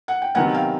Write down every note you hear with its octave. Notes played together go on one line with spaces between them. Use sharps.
F#5
G5
C3 D#3 F#3 B3 F#5 G#5
F5 G5